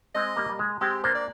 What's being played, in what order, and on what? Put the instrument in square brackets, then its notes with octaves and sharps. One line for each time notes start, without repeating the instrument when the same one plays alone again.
[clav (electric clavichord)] G#3 C4 [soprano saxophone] D#5
[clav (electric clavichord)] G3 A#3
G3
G#3
[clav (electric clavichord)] G#3 C4 [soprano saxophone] G4
[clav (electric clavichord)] A#3 D4 [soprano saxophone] C5
[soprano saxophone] D5